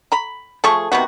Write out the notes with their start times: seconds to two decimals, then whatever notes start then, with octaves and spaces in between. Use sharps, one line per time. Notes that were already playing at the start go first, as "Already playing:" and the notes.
0.12 A#5 B5
0.64 F3 A3 G#4 C#6
0.92 C3 D#3 B3 F#4